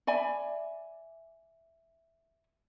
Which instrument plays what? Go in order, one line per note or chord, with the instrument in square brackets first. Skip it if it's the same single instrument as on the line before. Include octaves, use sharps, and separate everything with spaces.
[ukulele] D5 E5 G#5 B5